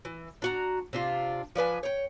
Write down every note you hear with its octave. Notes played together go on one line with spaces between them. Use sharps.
E3
D4 F#4 A#5
C3 D4 F4
F3 D4 B4 G#5
C#5 G5